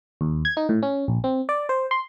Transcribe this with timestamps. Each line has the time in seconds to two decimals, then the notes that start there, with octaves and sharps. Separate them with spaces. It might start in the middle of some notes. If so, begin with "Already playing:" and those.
0.21 D#2
0.45 G#6
0.57 D#4
0.69 A2
0.83 C#4
1.08 A#1
1.24 C4
1.49 D5
1.69 C5
1.91 C6